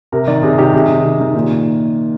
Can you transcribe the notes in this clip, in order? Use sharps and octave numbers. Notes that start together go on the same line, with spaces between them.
C3 A#4
D#3 D5
C3 G#4
D#3 G4
C3 G#4
D#3
C3
D#3
A#2